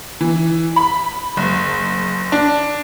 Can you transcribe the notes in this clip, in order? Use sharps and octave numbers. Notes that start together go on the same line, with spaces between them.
E3
B5
F#1
D4